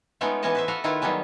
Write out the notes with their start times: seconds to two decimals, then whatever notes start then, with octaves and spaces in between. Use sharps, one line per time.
0.21 G#3 A3 B3 C#4 D#4 F4
0.42 E3 B3 C#4 C#5 D#5 A5
0.55 B4 C5 E5
0.68 B3 F#4 A4 F5 F#5
0.84 D#3 E4 F4 B4
1.02 D#3 F#3 G3 B3 C#4